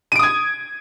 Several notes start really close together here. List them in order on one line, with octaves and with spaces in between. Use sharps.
D#7 D7 D#6 G#6